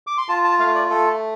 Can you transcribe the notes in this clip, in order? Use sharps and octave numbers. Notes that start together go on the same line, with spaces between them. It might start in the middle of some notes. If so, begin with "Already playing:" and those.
D6
C6
F4 A5
A5
A3 F5
D5
A3 A4